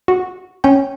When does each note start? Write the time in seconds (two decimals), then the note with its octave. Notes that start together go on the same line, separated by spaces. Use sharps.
0.08 F#4
0.64 C#4 G5